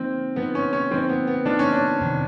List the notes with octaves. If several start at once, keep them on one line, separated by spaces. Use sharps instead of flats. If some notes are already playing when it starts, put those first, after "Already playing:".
Already playing: D3 F3 A#3 C4 D#4
D3 F3 A#3 B3 D#4
C#4
C#4
D3 F3 A#3 C4 D#4
B3
B3
D3 F3 A#3 D4 D#4
C#4
D4
F2 C3 D#3